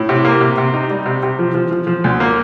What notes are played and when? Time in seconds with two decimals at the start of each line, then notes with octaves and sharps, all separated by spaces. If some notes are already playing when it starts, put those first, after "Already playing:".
Already playing: A2
0.09 C3
0.25 A#3
0.41 C3
0.58 C3
0.74 D#4
0.90 G3
1.06 C3
1.23 C3
1.39 F3
1.55 F3
1.71 F3
1.87 F3
2.04 D2
2.20 A#3